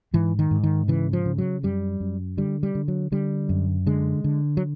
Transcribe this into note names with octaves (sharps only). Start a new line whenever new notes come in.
G#2 E3
D#3
G#2
D#3
C#3 E3
F3
C#3
F#3
F#2 G3
F#2
D3 G3
G3
D3
F#3
D3 G3
F#2
D3 G#3
D3
F#3